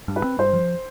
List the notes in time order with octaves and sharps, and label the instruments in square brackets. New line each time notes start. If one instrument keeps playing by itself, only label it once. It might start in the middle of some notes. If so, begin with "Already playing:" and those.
[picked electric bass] G2
[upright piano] B4
[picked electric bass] C4
[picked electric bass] G2 [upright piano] C5
[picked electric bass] F3